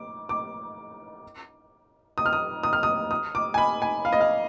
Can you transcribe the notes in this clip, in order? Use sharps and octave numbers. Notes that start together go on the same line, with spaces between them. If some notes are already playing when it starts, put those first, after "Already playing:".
Already playing: D6
D6
D#6
F6
D#6
D#6
F6
D#6
D#6
D6
G#5
B5
G#5
F5
D#5
F5